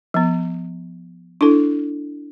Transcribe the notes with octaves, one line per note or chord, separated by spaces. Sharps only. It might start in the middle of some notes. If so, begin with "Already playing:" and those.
F3 B3
D4 E4 A4